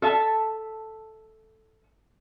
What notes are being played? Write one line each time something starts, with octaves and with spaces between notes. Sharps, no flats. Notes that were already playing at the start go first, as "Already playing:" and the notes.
A4 E5 A5